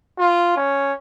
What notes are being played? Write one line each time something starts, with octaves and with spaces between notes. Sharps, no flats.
F4
C#4